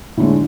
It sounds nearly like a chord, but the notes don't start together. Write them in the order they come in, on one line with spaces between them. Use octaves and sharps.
A2 D3 G#3